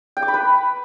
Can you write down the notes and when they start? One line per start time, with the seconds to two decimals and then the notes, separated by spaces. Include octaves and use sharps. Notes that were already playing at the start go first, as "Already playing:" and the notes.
0.17 G5
0.22 D6
0.28 B5
0.34 B4